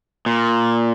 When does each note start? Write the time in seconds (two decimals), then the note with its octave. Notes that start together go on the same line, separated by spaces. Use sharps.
0.26 A#2